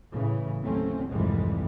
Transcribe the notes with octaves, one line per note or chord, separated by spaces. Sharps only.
A2 C#3 E3
D#2 A2 F#3 A3 C4 C#4
C2 F2 G#2 E3 G3 G#3